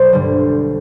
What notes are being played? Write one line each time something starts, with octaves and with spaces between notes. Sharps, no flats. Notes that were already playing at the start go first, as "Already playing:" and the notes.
Already playing: B1 B2 C5 D5
G2 D3 G3